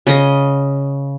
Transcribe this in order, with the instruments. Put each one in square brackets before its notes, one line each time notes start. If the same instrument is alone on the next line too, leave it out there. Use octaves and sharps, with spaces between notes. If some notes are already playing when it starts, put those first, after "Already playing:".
[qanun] C#3 D#5